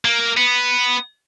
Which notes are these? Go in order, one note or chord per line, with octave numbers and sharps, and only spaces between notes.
A#3
B3